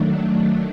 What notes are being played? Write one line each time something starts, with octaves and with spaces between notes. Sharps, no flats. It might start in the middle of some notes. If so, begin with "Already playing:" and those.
Already playing: D#3 F#3 A3 D4